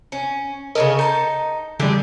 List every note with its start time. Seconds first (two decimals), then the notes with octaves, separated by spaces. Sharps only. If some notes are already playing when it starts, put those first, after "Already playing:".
0.12 C#4
0.75 C#3 A4 A#4 C#5 D#5
0.99 D#4 A5 G6 C#7
1.80 D3 G3 G4 G#4